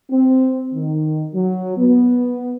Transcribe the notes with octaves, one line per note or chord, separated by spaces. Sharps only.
C4
D#3
F#3
B3